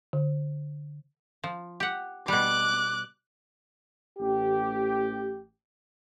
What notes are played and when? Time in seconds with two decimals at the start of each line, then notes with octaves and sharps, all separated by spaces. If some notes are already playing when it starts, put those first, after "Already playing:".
0.13 D3
1.44 F3
1.80 G4 F#5
2.28 B2 G3 D6 F#6
4.19 A1 G4